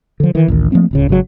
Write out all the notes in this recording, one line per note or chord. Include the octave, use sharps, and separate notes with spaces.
D3 F3
D#3 E3
A1 D2 D#3
F3 A3 A#3 C4
D1 C#2 C#3
G#1 C#3 E3 F#3